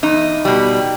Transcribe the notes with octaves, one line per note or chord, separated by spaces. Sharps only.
E2 D#4
B2 G3